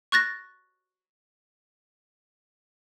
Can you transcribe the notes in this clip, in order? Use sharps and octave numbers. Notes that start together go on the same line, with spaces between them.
C#6 F#6 A6 A#6